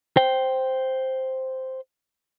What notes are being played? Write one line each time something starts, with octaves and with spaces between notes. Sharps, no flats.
C5 G5